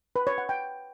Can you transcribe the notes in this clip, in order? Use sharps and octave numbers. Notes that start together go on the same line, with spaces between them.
B4
C#5
F#5
G5